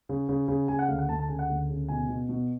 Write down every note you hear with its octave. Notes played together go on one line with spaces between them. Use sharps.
C#3
C#3
C#3
C#3 G#5
F#5
D2 F5
F#5
D2 A5
A5
C#3 G#5
F#5
D2
C#3
B2 G#5
B2
B2